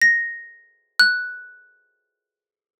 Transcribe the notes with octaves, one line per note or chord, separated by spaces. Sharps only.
A#6
F#6